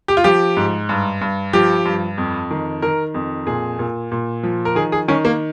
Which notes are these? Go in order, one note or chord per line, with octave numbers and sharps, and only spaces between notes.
G4
F4
F3 G4
G#2
G2
G2
F3 G4
G2
F2
D#3
D#3 A#4
F2
A#2 G#4
A#2
A#2
F3
A#4
D#3 G#4
G#4
D#3 C#4
A#3